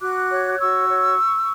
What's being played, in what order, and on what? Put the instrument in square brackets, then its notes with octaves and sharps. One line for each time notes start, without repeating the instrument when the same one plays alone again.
[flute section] F#4 D6 F#6
C#5
F#6
F#4 C#6 E6
C#5